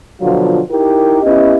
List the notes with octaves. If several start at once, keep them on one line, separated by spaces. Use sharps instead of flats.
B2 D3 F3 F#3 F4
D#4 E4 G4 A#4
B3 C#4 E4 G4 D#5